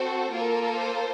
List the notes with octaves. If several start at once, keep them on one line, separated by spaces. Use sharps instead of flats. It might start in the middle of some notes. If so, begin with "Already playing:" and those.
Already playing: C4 F#4 A4 C5
A#3 F4 A4 A#4
C5